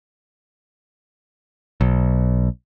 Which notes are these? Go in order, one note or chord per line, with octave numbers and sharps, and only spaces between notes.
B1